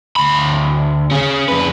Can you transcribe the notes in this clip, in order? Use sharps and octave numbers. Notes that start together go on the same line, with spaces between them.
D2 B5
C#4 G#4
F2 B4